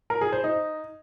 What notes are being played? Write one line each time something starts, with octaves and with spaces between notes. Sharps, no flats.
A#4
G#4
C5
D#4